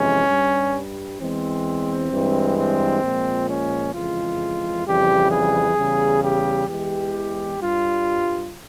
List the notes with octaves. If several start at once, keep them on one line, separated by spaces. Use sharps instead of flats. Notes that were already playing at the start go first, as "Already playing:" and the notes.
Already playing: F2 C3 E3 G#3 C#4
G2 G3
E2 E3 G#3 C4
G2 E3 G#3
C4
A#2 F3 G#3
C#4
F2 C#3 E3 G#3 F4
F2 C#3 E3 G3 G4
G#4
E2 C#3 G3
G4
E2 E3 G#3 G4
G2 G3 F4